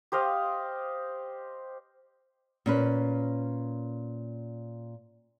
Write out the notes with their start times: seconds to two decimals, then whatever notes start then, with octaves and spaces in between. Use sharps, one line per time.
0.12 G4 C5 D#5 F5
2.66 A#2 C#4 B4